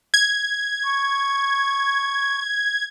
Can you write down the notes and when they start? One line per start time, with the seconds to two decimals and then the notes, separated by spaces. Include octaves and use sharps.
0.14 G#6
0.84 C#6